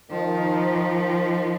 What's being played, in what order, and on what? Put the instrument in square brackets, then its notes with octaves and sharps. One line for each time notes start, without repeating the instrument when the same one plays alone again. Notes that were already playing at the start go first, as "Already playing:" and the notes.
[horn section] D#3 [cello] F3